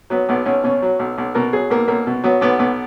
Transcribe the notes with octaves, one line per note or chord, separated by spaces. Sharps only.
F#3 B3
B1 B3
B1 C#4
B2 C#4
F#3
B1
B1
B2 A#4
F#3 G#4
B1 A#3
B1 A#3
B2
F#3 B3
B1 B3
B1 B3